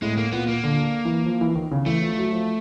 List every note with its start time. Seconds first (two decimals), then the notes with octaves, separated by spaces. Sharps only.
0.02 A2 G#3
0.17 A#3
0.32 A#2 B3
0.48 A#3
0.64 D3
1.05 E3
1.25 F3
1.41 E3
1.55 D#3
1.71 C#3
1.86 E3 A3
2.02 F3
2.18 F#3
2.32 F3